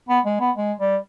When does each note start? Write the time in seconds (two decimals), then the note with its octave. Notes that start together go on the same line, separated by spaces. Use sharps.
0.09 B3
0.25 G#3
0.40 B3
0.56 G#3
0.80 G3